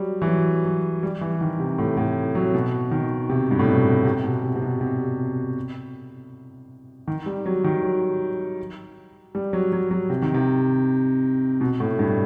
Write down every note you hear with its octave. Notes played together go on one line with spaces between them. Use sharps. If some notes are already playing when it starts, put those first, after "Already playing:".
Already playing: F#3 G3
E3
F#3
F#3
G3
E3
D#3
C3
A2
A2
F#3
B2
D#3
C3
G2
A2
B2
C3
B2
C3
C3
B2
C3
D#3
G3
F#3
D#3
F#3
G3
F#3
F#3
F#3
C3
D#3
C3
B2
A2
G2